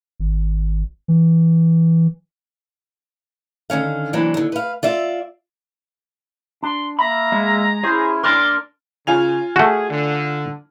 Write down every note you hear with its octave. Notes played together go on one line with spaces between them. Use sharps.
G#1
E3
D3 D#3 C#4 F5
C3 E3 F#3 A#3 D4
D#2 D3
B4 F5
F4 D5 E5
D4 C6
A#3 E5 A#5 B5
G#3
C#4 E4 G#4 C5
D4 A#4 C6 D6
C#3 F4 G#5 F7
A3 F#4 G#4
D3